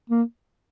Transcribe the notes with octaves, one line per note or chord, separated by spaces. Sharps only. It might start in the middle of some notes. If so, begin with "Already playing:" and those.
A#3